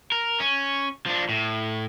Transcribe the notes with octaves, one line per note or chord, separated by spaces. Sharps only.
A#4
C#4
F3 D4
A2